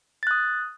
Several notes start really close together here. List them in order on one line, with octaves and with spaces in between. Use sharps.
A6 F#6 D#6